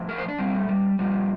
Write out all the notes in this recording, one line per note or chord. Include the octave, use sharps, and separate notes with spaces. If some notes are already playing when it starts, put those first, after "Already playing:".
Already playing: A2 F3
A#4
C5
D4
A#2 G3 C4
A3
G3
A#2 F3 G3